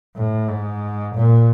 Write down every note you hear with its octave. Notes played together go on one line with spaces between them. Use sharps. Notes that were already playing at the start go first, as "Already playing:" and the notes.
A2
G#2
A#2